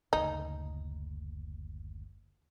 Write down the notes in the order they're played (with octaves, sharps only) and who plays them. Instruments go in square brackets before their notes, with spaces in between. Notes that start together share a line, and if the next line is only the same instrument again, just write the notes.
[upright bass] F#1 D2 [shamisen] D#4